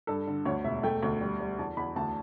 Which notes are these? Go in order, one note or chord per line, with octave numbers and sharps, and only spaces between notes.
G2 A4
D3
D2 C#5
E1 E5
A3 G5
D2
G3
G3
E2 A5
E2 B5
D2 A5